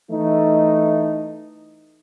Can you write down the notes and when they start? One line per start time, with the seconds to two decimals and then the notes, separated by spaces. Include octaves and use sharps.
0.11 E3 A3 D#4